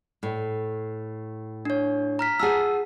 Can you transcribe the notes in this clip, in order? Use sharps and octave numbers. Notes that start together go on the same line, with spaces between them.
A2
D4 C#5
A#5 F6 B6
F4 G#4 F#5 A5 E6